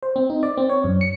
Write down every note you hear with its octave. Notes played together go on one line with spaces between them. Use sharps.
C5
C4
D#4
D5
C4
C#5
F#2
C#7